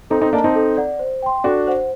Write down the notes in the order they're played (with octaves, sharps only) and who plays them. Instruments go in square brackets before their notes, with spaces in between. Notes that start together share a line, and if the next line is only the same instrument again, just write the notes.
[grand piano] C4 D#4 [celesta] A4
[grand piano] C4 D#4
[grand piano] A#3 D4 [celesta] D#5 A5
[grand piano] C4 D#4
[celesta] A4
D5 F#5
C5
G5 C6
[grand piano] D4 F#4 [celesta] A4
[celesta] C5 F#5